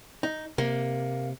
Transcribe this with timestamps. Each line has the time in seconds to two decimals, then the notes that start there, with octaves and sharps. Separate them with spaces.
0.23 D#4
0.58 C3 A#3